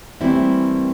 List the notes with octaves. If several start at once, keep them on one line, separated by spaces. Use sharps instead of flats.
E3 G3 A3 A#3 C4 E4